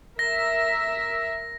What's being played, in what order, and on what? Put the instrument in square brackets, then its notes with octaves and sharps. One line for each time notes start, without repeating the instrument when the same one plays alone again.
[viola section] A#4 E5 [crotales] A#6